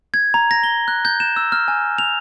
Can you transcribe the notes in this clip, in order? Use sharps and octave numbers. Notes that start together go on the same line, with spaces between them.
G#6
A#5
A#6
G7
F#6
G6
E7
E6
F6
G#5
F7